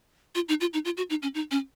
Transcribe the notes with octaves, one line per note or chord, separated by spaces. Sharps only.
F4
D#4
F4
D#4
F4
F#4
D#4
C#4
D#4
C#4